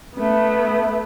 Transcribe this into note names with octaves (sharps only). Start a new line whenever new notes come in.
A3 B3